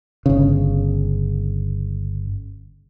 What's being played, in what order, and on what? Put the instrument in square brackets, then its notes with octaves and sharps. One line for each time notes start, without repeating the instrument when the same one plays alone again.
[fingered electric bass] G1 C#3